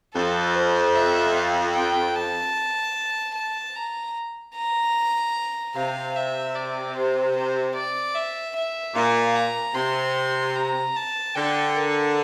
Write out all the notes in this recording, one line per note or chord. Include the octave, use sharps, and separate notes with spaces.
F2 A4
C5
E5
F5
G5
A5
A5
A#5
A#5
C3 F5
E5
D5
C5
C5
D5
E5
E5
A#2 F5
A#5
C3 C6
A#5
A5
D3 G5
A#4